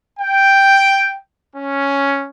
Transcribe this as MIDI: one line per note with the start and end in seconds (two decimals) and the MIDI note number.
0.20 1.18 79
1.56 2.29 61